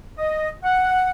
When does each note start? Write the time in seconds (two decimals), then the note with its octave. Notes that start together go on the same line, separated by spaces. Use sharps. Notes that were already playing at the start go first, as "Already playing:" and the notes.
0.19 D#5
0.64 F#5